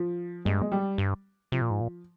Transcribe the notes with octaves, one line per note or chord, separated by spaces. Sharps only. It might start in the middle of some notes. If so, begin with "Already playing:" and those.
Already playing: F3
G2 G#3
G#3
G3
G2
C3 F3
A#2
G#2
A#2